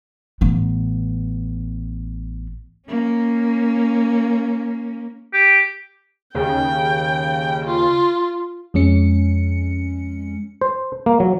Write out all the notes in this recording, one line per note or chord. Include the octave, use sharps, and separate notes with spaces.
A1 B3
A#3 C#4
G4
D#2 C#3 G5
F4
F2 G#3 C#4 C#7
C5
A#3
F#3